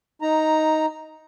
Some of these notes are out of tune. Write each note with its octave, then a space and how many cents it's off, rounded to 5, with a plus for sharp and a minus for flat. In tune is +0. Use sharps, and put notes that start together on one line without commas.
D#4 +10 A#5 +0